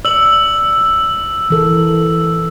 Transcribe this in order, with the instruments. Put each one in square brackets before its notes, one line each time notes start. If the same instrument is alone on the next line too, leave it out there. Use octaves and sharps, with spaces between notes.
[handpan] D5 [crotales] E6 F#7
[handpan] E3 A4 A#4